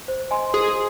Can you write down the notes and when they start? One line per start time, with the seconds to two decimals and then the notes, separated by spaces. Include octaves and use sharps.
0.08 C5
0.31 D#5 G#5 C6
0.53 G#4 C5